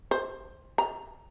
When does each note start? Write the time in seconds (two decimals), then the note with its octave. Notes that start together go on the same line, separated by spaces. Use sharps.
0.11 C5
0.78 A#5